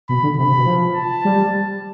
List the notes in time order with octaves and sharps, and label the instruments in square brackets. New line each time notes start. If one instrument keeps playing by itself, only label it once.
[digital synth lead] B2 [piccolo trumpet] B5
[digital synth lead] D3
[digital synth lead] C3 [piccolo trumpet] B5
[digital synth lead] C3
B2
F3
[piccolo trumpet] A5
[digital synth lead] G3